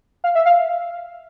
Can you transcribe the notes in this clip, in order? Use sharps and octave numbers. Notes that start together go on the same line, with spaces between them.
F5
E5
F5